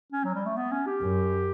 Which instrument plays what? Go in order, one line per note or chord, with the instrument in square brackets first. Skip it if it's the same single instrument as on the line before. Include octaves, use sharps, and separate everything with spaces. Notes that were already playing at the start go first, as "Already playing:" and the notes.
[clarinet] C#4
F#3
G3
A3
B3
C#4
G4
[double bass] F#2